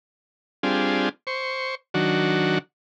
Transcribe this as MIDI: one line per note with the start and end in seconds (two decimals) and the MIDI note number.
0.63 1.09 55
0.63 1.09 60
0.63 1.09 62
0.63 1.09 65
0.63 1.09 68
1.27 1.75 72
1.27 1.75 85
1.94 2.58 51
1.94 2.58 54
1.94 2.58 62
1.94 2.58 66